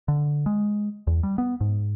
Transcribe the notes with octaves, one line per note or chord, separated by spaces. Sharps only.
D3
G#3
E2
G3
B3
G#2